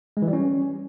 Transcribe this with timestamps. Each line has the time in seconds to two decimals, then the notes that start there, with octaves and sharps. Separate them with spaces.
0.17 G#3
0.22 E3
0.28 G3
0.33 C#4